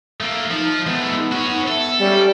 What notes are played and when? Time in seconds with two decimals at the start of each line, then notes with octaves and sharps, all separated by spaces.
0.21 A3 A#3
0.51 F3 D#4
0.86 G#3 A3 B3
1.32 C#4 F#4
1.67 A4 E5
2.00 G3 C#4